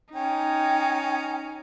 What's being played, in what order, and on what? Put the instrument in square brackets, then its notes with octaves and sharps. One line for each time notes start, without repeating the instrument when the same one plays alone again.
[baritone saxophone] C#4 [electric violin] D#4 [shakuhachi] G5